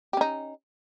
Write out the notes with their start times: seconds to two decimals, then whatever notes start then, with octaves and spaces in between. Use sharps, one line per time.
0.13 G4
0.17 C#4
0.21 D#4